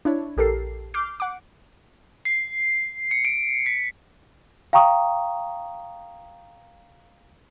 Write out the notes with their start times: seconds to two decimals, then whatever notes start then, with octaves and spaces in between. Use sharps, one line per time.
0.05 D4 E4 C#5
0.37 A#1 G4 A4 A#4 C7
0.94 D6 F6 G6 C7
1.20 F#5 D6
2.25 C7
3.11 C#7
3.25 D7
3.66 B6
4.73 F5 G5 A#5 C#6 D#6